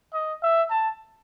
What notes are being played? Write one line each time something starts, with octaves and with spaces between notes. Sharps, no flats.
D#5
E5
A5